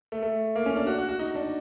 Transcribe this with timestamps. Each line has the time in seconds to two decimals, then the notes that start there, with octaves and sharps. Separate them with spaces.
0.12 A3
0.23 A3
0.55 A#3
0.66 C#4
0.76 D4
0.87 F#4
0.98 F#4
1.09 F#4
1.19 D#4
1.35 D4